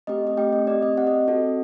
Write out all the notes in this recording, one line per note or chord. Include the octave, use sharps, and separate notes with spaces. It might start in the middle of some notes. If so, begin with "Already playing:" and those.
A3 C4 G4 D#5
D#5
A3 C4 G4 G5
D#5
C4 G4 D5
D#5
C4 G4 F#5
D#5
C4 F#4 A4